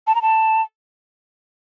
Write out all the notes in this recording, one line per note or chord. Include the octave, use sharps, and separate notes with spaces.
A5
A#5
A5